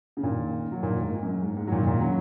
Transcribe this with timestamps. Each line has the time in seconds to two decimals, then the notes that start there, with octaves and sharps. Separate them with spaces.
0.17 C#3
0.23 A#2 D#3
0.72 F#3
0.83 A#2 D#3
1.03 G#2
1.22 F#2
1.42 G#2
1.57 G#2
1.67 F#3
1.72 A#2 D#3
1.87 A#2 D#3
2.01 C#3 F#3